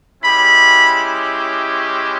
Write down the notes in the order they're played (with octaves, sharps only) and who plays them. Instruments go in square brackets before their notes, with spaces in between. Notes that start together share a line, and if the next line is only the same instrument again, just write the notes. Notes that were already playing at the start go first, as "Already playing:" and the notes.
[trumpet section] G#3 C#4 E4 G4 B5